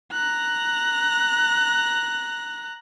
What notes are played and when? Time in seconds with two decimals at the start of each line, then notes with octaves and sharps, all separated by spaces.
0.13 A#5 F#6